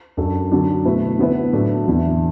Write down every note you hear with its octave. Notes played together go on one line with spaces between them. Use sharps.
F#2 F#3 D4 A4
D3 F#3 D4
B2 A3 E4 B4
D3 B3 E4 B4
A2 F#3 D4 A4
E2 E3 D4